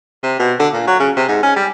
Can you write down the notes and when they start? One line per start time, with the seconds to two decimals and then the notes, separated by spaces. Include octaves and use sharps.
0.23 C3
0.39 B2
0.59 D3
0.73 A#2
0.87 F#3
1.00 C#3
1.16 C3
1.28 G#2
1.43 C#4
1.56 G3